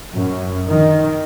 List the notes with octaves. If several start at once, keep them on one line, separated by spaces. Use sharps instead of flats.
F#2
D#3